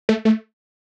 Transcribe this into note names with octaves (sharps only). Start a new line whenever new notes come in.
A3
A3